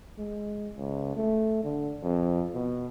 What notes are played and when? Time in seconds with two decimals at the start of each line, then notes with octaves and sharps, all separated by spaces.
0.18 G#3
0.77 C#2
1.16 A3
1.63 D3
2.03 F2
2.55 B2